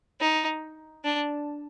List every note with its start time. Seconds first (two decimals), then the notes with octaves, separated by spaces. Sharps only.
0.21 D#4
1.05 D4